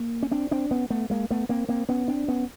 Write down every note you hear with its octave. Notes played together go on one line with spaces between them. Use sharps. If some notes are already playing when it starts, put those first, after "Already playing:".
Already playing: A#3
C#4
C4 D4
C4 D4
B3 C#4
A3 B3
G#3 A#3
A3 B3
A#3 C4
A#3 C4
B3 C#4
C4 D4
B3 C#4